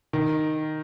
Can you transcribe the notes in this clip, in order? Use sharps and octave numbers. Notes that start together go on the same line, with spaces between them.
D#3